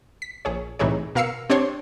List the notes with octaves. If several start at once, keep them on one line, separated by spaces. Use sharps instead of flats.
B6
A#1 G#4 C#5
C2 A2 E3 D#4 G#4 C#5
B2 A#4 F5 E6 C7 C#7
C4 D4 G4 C5 C#5 C6